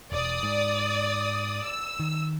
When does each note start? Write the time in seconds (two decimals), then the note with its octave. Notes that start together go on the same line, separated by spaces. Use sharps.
0.12 E1 D5 D#6
0.43 G#2
1.64 E6
2.00 D#3